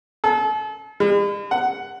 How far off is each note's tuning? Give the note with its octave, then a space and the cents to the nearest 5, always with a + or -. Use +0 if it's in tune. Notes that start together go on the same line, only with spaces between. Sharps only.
A4 -45
G#3 -45
F#5 +5